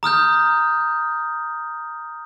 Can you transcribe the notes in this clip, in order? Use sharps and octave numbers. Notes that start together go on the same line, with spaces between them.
A#5 D#6 F6 G6